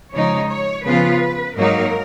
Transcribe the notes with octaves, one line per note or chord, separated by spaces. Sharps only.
C#3 F3 G#3 D#4 C#5
C#5
C#3 F3 B3 F4 B4
G#2 F#3 A#3 D#4 A#4